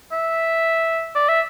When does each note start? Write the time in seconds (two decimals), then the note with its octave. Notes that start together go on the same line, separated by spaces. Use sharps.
0.12 E5
1.15 D5
1.29 E5